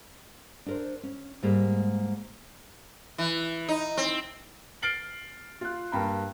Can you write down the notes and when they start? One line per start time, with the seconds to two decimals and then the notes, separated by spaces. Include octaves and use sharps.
0.66 D4 A#4 C5
1.03 C#4
1.43 G#2 G3 G#3 A#3
3.18 E3
3.68 D#4
3.97 C4
4.82 F6 A6 C7 D7 F#7 G7
5.61 F4 F#6
5.92 G2 A#3 G5 A#5 B5